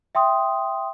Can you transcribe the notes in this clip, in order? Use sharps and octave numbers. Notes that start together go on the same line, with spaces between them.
E5 G5 C6 D#6